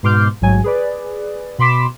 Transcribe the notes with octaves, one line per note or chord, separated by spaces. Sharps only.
G#2 B2 C6 D6 F6 G6
A1 G#2 F#3 G#5
G#4 B4 D5
B2 B5 C6 D6 B6 E7